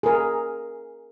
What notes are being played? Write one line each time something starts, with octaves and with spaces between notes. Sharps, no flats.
G#4 A#4